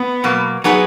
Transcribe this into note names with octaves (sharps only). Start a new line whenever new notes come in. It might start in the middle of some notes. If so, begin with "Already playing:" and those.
Already playing: B3
B2 F#3 A#3
F#3 B3 D#4 G#4 B4